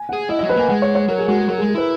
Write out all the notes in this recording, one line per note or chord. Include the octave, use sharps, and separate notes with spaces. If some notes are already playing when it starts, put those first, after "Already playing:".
Already playing: G#5
G#4 F#5
E4 D#5
F#3 D#5
B4
A#3 G#5
G#3 F#5
C#5
C#5
F#3 A#4
G#4
G#3 F#4
G#4
F#3 A#4
G#4
G#3
G#4
E4 B4